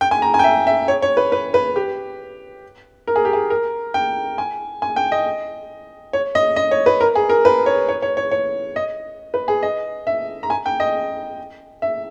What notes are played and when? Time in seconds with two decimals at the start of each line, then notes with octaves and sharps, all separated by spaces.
0.01 G5
0.11 G#5
0.22 A#5
0.34 G#5
0.39 G5
0.44 E5
0.67 E5
0.88 C#5
1.02 C#5
1.17 B4
1.32 B4
1.54 B4
1.76 G4
3.07 A#4
3.16 G#4
3.25 G4
3.33 G#4
3.50 A#4
3.94 G5
4.38 G#5
4.82 G#5
4.96 G5
5.12 D#5
6.13 C#5
6.35 D#5
6.56 D#5
6.71 C#5
6.86 B4
7.01 A#4
7.16 G#4
7.29 A#4
7.45 B4
7.66 C#5
7.89 C#5
8.02 C#5
8.17 C#5
8.31 C#5
8.76 D#5
9.34 B4
9.48 G#4
9.63 D#5
10.07 E5
10.43 A#5
10.50 G#5
10.66 G5
10.80 D#5
11.82 E5